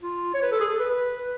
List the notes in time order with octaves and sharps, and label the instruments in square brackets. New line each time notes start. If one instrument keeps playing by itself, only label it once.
[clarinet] F4
C#5
B4
A4
G#4
A4
B4
B4
B4